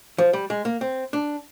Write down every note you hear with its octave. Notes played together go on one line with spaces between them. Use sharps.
F3
G3
G#3
A#3
C4
D4